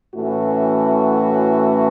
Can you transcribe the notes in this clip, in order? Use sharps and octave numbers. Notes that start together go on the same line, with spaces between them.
A2 E3 A3 C#4 E4 F#4